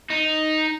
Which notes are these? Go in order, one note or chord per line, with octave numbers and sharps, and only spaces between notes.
D#4